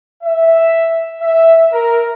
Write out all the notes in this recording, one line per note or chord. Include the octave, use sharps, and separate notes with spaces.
E5
E5
A#4